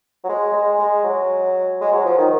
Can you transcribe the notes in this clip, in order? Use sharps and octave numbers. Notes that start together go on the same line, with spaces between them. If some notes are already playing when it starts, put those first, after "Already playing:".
F#3
G#3
G#3
G#3
F#3
G#3
F#3
F3
D#3